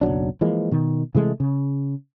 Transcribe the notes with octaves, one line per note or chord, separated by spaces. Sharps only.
F#1 B1 F#3 D4
E3 F3 G#3 A#3
B2 D#3
C3 E3 G#3 A3
C#3